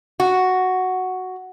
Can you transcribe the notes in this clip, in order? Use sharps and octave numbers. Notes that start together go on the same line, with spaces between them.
F#4